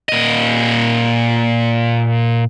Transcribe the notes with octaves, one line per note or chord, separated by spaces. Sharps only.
A#2 D#5